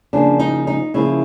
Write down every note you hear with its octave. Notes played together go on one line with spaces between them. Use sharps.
C#3 F3 A#3 D4
D#4
D#4
C#3 F3 A#3 E4